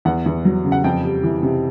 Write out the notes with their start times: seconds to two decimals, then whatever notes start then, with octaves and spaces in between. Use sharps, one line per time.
0.05 E2 F#5
0.26 E2
0.45 F#3
0.65 C#3
0.72 F#5
0.84 F2 G5
1.03 G3
1.23 E3
1.43 C3